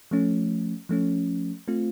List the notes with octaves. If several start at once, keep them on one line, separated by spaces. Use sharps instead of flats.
F3 A3 C#4
F3 A3 C#4
A3 C4 F4